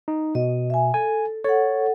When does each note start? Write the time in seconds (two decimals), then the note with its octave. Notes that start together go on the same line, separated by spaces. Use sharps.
0.08 D#4
0.35 B2 D#5
0.70 E5 G#5
0.94 A4 G#5
1.45 A4 C#5 F#5